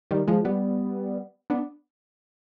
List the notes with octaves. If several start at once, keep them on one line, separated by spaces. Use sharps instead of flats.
D#3 G3
F3 G#3
G3 B3
B3 D4